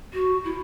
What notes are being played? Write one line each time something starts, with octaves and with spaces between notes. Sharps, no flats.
F#4
E4